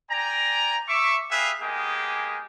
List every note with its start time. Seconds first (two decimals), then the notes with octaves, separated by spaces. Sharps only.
0.10 D5 G5 G#5 A#5
0.88 E5 C#6 D6
1.30 G4 G#4 B4 E5 F5
1.61 G#3 A#3 B3 G4 G#4 D#5